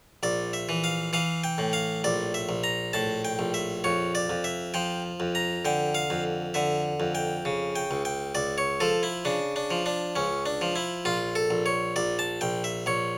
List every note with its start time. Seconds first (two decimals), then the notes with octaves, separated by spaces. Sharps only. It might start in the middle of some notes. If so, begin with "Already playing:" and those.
0.23 A#1 D5
0.53 E5
0.69 E3
0.84 F5
1.13 E3 F5
1.44 G5
1.58 A2
1.73 F5
2.04 A#1 D5
2.34 E5
2.49 A#1
2.64 A#5
2.93 A2 A5
3.25 G5
3.39 A#1
3.54 E5
3.84 F2 C#5
4.15 D5
4.30 F2
4.44 E5
4.74 F3 G5
5.20 F2
5.35 A#5
5.65 D3 G5
5.95 F5
6.10 F2
6.54 D3 E5
7.00 F2
7.15 G5
7.45 C#3
7.76 G5
7.91 C#2
8.05 G5
8.35 C#2 D5
8.58 C#5
8.80 F3 A4
9.03 E4
9.25 C#3 D4
9.56 D4
9.71 F3
9.86 D4
10.16 C#2 C#4
10.46 D4
10.61 F3
10.76 E4
11.05 A#1 F4
11.35 A4
11.50 A#1
11.66 C#5
11.96 A#1 D5
12.19 A5
12.41 A#1 G5
12.64 E5
12.86 A#1 C#5